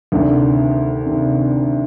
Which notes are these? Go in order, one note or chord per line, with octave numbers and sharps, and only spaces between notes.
D2 C3 D#3 D4
C3 D#3